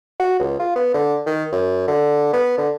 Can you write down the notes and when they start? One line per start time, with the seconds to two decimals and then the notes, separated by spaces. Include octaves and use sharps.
0.20 F#4
0.39 C#2
0.59 F4
0.76 B3
0.94 D3
1.26 D#3
1.52 F#2
1.88 D3
2.33 B3
2.58 D3